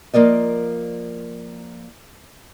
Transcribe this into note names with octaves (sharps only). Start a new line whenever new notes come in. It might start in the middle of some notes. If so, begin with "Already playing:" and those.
F3 A#3 A#4 D5 D#5